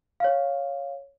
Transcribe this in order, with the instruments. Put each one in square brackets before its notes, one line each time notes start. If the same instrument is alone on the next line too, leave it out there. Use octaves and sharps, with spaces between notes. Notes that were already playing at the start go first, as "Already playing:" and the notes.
[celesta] C#5 F5